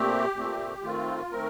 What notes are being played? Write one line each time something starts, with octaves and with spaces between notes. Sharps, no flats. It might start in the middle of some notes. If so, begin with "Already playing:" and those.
Already playing: A#2 A3 C4 G4
A#2 A3 C4
D#3 A3 C4 F4
D#3 A3 C4 A#4